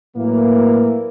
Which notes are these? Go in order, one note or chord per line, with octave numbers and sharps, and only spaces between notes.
A2 E3 F#3 A#3